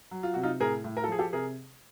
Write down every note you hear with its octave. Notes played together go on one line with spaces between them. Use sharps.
F#3
F4
C3 F#4
D#4 F4
A2 G#4 A#4
A2
A#4
A4
F3 G#4
G4 A4
C3 G#4 A#4